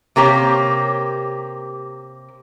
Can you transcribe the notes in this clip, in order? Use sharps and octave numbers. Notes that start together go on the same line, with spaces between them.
C3 A#3 G4 C#5